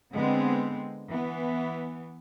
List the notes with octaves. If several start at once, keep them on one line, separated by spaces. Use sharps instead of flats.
D3 G#3 B3 C4
E3 B3